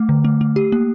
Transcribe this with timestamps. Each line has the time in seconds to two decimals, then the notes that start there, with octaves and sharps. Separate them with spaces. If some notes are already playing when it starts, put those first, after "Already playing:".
Already playing: A3
0.09 D3
0.25 A3
0.41 A3
0.56 G4
0.72 A#3